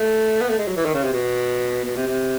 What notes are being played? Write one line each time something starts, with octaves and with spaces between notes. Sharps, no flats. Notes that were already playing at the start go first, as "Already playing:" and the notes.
Already playing: A3
B3
A3
G#3
F#3
E3
D#3
C#3
C3
B2
B2
C3
C3